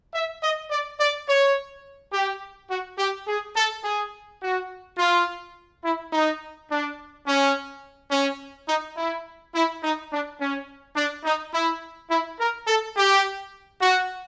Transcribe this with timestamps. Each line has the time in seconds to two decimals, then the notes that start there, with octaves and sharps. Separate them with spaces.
0.13 E5
0.43 D#5
0.71 D5
1.00 D5
1.27 C#5
2.13 G4
2.71 F#4
2.98 G4
3.28 G#4
3.56 A4
3.84 G#4
4.42 F#4
4.98 F4
5.84 E4
6.13 D#4
6.69 D4
7.27 C#4
8.11 C#4
8.68 D#4
8.97 E4
9.55 E4
9.83 D#4
10.11 D4
10.39 C#4
10.96 D4
11.24 D#4
11.54 E4
12.10 E4
12.39 A#4
12.67 A4
12.96 G4
13.81 F#4